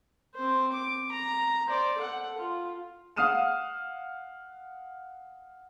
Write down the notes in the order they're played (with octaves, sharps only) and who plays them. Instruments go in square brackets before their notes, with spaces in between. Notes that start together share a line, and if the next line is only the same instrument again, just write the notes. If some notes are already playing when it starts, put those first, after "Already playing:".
[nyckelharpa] C4 C5
D6
A#5
C5 D5
A4 F#5
F4
[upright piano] F5 F#5 D#6 F6 D#7 E7